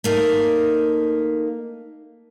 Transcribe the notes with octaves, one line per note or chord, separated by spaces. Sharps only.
A3 A#3 D#4